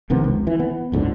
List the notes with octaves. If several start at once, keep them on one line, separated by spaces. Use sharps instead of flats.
F1 C3 D#3 B3
C#2
E3
B3
F#1 C#2 G#2 D3